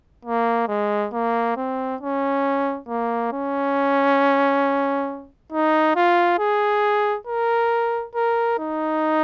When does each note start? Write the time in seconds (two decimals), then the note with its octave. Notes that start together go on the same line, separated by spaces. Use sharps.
0.25 A#3
0.68 G#3
1.13 A#3
1.56 C4
2.01 C#4
2.88 A#3
3.32 C#4
5.52 D#4
5.96 F4
6.39 G#4
7.27 A#4
8.15 A#4
8.58 D#4